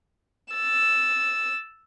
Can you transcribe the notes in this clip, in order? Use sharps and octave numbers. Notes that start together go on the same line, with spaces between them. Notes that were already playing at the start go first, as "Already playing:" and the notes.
E6 A6